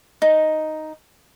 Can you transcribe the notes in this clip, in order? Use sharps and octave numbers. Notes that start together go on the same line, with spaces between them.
D#4